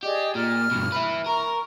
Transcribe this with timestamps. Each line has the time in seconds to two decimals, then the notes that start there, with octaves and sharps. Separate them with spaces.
0.03 G4 G#4 D5 D#5
0.35 A#2 F6
0.71 G2 B2
0.92 E4 B4
1.26 A#4 A#5 C#6